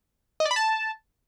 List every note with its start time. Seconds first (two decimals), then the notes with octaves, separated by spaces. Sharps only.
0.40 D#5
0.45 D5
0.51 B5
0.56 A5